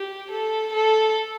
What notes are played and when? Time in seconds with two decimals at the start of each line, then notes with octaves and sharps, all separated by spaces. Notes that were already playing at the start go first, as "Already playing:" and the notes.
Already playing: G4
0.31 A4
0.73 A4